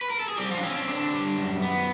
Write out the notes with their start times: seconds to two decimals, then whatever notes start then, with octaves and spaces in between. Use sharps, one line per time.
0.01 B4
0.10 A#4
0.19 A4
0.29 G#4
0.38 G3 C4 G4
0.50 F3 F4
0.57 D4
0.63 C4 C#4
0.76 D4
0.82 C#4
0.87 D3 D4
1.12 G3
1.37 F#2
1.62 B3